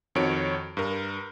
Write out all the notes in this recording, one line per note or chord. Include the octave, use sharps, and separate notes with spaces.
F2 D#3 F#4 C#5 D7
G2 A#4